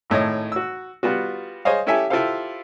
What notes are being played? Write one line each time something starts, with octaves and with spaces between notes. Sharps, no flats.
G#1 A2 C#5 D#5
F#4 E6
G3 B3 F4 F#4
G#4 C5 C#5 D#5 F5
C#4 E4 G4 A4 E5 G#5
E4 F4 G4 A4 C5 F5